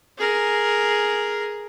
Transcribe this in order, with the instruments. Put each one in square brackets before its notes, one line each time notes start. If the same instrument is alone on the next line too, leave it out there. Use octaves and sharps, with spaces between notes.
[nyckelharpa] G#4 A#4